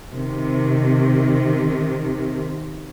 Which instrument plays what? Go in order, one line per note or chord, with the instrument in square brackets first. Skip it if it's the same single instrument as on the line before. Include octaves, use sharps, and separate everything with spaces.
[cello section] C3 D#3